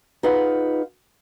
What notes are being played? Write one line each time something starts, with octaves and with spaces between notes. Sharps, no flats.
D#4 F4 G#4 B4 F5 F#5